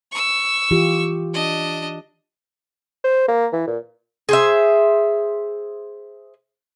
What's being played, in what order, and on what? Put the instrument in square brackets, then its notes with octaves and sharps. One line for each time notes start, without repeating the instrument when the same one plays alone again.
[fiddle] C#6 E6
[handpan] E3 F4 G4
[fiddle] D4 D#5
[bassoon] C5
A#3
E3
A#2
[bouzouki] G#4 C5 E5